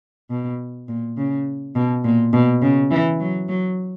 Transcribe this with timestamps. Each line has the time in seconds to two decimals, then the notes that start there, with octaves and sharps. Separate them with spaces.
0.30 B2
0.88 A#2
1.17 C#3
1.75 B2
2.04 A#2
2.33 B2
2.62 C#3
2.91 E3
3.20 F#3
3.49 F#3